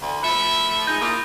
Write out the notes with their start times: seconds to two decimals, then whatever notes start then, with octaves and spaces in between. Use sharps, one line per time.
0.01 D2
0.23 F3 A3 E5 B5 F#6 C#7
0.87 G#3 D#4 G6
1.01 A#3 E4 F4 D#6